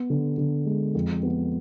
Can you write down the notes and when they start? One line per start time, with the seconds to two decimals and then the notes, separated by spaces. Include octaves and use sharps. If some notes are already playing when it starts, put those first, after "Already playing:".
Already playing: B3
0.10 D3
0.38 D3
0.66 G#3
0.95 F2
1.23 B3